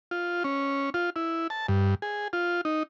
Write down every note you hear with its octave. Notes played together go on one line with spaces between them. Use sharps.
F4
C#4
F4
E4
A5
G2
G#4
F4
D#4